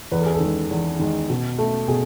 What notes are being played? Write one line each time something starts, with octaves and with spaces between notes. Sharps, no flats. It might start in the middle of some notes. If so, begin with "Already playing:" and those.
E2 B4
A4
G#4
A4
D#3 G#3
E2
D#3 G#3
B2
A3
B2 G#4